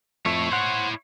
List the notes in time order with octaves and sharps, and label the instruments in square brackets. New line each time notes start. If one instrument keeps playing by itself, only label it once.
[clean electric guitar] F2 A3 [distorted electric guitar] E4 C#5
[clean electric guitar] C5 F#5